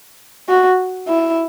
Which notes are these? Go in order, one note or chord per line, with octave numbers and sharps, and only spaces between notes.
F#4
E4